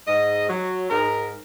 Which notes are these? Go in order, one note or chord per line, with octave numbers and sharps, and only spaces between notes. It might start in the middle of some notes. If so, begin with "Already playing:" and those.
G#2 D#5
F#3
G#2 A#4